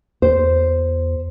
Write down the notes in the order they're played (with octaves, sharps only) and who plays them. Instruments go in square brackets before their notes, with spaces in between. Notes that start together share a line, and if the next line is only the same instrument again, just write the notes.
[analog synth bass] E2 [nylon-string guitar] C5